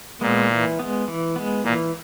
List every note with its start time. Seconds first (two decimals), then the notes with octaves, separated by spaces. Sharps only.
0.21 A#2 G#3 B3
0.50 E3
0.79 G#3 B3
1.08 E3
1.36 G#3 B3
1.64 A#2 E3